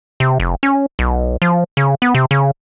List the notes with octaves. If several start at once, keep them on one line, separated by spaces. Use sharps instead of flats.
C3
F1
C#4
B1
F3
C#3
B3
C3
C#3